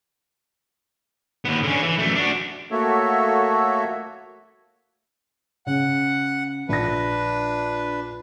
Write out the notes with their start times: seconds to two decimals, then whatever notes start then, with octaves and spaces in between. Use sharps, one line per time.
1.45 D#2 B3
1.63 D3 C#4
1.83 E3
1.99 F#2 A3
2.15 D4 F#4
2.71 A3 A#3 F#4 A4 C#5 E5
5.67 C#3 F#5
6.69 A#1 D4 B4 A#6